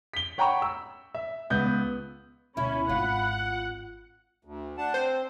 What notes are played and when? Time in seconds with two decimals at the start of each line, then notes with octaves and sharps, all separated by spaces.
0.14 B6 G7
0.38 C#5 F#5 G5 A#5 B5 C#6
0.62 E6
1.15 E5
1.50 C#2 B3 G6
2.57 D2 B2 C#4 E4 B5
2.89 G#1 F4 F#5
4.45 D2
4.78 D4 F#5 A5
4.94 C4 C5